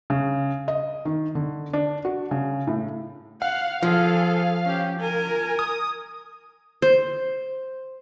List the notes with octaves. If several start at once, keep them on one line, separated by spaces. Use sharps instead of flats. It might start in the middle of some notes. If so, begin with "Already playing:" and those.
C#3
D#5
D#3
D3
D4
F#4
C#3
A2
F5 F#5
F3 G#4 A4
C#4 G4
A#4 G#5
D#6
C5